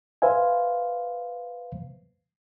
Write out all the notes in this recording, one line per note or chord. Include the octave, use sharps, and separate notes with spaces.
B4 C5 E5 F5 G#5